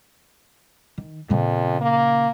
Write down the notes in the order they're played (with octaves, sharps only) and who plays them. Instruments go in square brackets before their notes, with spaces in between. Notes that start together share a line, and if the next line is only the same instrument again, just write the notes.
[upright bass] D#3
[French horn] F2 [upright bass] A#2 C#3
[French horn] A#3